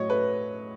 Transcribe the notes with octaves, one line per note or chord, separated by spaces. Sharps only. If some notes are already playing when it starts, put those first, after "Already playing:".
Already playing: A2 F#3 C#5 D#5
A3 B4